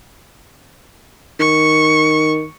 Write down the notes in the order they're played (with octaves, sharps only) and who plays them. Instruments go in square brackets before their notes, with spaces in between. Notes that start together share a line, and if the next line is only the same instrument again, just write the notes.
[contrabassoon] D#3 [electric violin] C#6